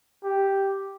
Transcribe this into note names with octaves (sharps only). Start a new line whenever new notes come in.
G4